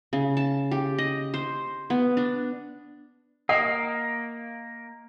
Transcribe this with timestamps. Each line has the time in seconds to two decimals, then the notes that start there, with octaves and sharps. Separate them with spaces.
0.13 C#3
0.37 A5
0.71 G4
0.98 D#5
1.34 C5
1.90 B3
2.17 D4
3.49 A#3 D#5 F#5